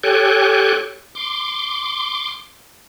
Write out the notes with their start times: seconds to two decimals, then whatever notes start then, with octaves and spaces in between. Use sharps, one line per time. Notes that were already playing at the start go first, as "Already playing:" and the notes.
0.04 G4 A4 C#5 G5 G#5 F#6
1.15 C6 D6